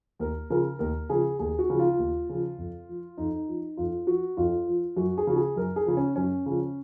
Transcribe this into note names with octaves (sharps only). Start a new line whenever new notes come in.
D#2 A#4
C#3 F3 A#4
D#2 A#4
C#3 F3 G#4
D#2 G#4
F#4
C#3 F3
F4
D#2
C#3 F3
F2
F3
F2 D#4
F3
F2 F4
F3 F#4
F2 F4
F3
F#2 F#4
G#4
C#3 F3 F#4
G#4
F#2 A#4
G#4
C#3 F3
C#4
F#2 C#4
C#3 F3